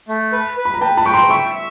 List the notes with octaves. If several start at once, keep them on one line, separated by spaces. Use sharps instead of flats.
A3
B4
B4
B5
A#5
B4 G5 A5
A5 B5
G5 C#6
A#5 C6
E5 B5 C#6
E5